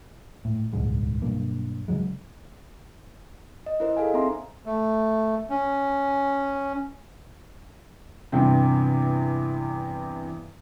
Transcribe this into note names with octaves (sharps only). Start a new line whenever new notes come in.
A2
D#1 C#2 G#2 G#3
B1 G2 A#3
C#3 E3 F#3 G#3
D#5
E4 A#4 C5 D#5
G#4 A4 F5 G#5
C4 D#4 E5 A#5 C6
A3
C#4
E2 G2 C3 C4